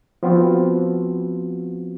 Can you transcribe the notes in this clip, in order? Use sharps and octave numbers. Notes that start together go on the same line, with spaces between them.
F3 B3 C4 F4 F#4